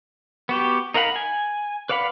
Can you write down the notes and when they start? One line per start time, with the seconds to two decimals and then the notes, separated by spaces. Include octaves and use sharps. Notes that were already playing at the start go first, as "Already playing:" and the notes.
0.49 B3 F#4 G4
0.94 D#4 A#4 F5 F#5 B5
1.16 G#5
1.89 B4 D5 F5 F#5 B5